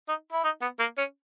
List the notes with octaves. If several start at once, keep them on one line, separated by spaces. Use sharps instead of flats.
D#4
E4
D#4
B3
A#3
C#4